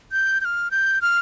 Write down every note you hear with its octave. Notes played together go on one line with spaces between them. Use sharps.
G6
G6
F6
G6
F6